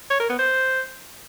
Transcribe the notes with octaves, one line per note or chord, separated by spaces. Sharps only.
C#5
A#4
B3
C5